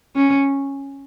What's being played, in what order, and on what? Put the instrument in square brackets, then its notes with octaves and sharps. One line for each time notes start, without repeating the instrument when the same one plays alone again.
[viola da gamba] C#4